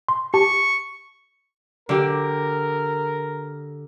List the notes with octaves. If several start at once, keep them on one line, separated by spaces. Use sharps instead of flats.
C6
G4 A5 C#6
D3 G4 A#4